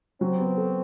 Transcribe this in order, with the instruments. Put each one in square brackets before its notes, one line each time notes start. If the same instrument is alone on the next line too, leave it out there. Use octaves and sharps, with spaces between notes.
[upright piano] F#3 [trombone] C4
[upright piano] B3
A4